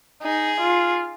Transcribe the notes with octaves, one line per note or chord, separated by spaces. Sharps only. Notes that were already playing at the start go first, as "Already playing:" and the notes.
D#4 G#4
F4